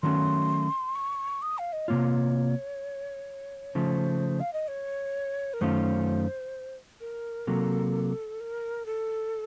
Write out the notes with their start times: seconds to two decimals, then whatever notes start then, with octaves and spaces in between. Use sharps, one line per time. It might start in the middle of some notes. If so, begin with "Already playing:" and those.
0.02 D#3 F#3 A3 C#4 F#4 C6
0.95 C#6
1.42 D#6
1.58 F5
1.73 D#5
1.88 C3 D#3 A#3 F4 C#5
3.75 C#3 F3 A3 C5
4.40 F5
4.53 D#5
4.68 C#5
5.54 A#4
5.61 F#2 D#3 A3 C#4 F4 C5
7.00 A#4
7.47 C3 F#3 A#3 A4
8.40 A#4
8.86 A4